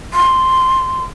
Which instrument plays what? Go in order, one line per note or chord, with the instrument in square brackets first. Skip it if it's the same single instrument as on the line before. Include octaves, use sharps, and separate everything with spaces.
[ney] C6